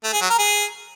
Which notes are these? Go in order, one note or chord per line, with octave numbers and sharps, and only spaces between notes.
A3
G#4
F#3
A#4
G#4